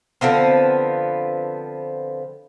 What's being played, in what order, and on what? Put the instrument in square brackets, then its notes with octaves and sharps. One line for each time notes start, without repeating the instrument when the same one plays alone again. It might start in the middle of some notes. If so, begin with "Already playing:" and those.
[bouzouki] D3 F3 B3 C4